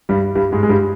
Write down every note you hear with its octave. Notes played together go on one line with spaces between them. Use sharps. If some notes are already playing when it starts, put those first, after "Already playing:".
G2 G3
G2 G3
G#2 G#3
G#3
G2 G3